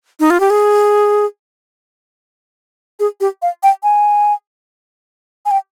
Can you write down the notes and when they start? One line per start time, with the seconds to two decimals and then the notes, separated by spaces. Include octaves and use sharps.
0.20 D#4
0.30 F4
0.40 G4
0.50 G#4
3.00 G#4
3.20 G4
3.42 F5
3.63 G5
3.83 G#5
5.45 G#5
5.51 G5